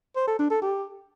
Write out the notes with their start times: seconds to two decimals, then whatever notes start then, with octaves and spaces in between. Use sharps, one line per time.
0.16 C5
0.27 A4
0.39 D4
0.51 A4
0.62 G4